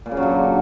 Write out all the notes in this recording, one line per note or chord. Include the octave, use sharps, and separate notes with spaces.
A#2
C#3
F#3
D3